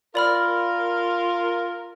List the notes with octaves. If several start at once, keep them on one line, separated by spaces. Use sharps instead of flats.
F4 A#4 D5 B5 F6